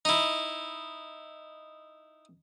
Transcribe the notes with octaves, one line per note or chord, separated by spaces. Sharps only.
D#4 E4